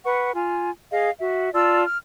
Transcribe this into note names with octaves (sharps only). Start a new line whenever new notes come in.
B4 F#5 C#6
F4 G#5
G#4 D#5 F5
F#4 E5
F4 D5 A5 E6
F6